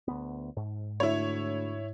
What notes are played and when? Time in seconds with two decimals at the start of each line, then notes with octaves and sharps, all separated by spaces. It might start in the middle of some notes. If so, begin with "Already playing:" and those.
0.08 D2 B3
0.57 G#2
1.00 D2 E4 C#5